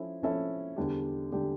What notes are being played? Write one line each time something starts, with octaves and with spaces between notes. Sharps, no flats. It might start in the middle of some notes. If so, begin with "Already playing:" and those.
Already playing: F3 C#4 E4 A4
F3 C#4 E4 A4
E2 D3 G3 D4 G4
D3 G3 D4 G4